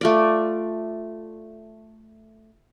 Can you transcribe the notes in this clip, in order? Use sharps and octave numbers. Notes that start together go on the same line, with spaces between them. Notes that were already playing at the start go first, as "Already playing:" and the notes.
A3 F4 D5